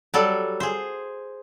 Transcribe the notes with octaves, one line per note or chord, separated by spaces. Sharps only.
F#3 G3 A4
G#4 C5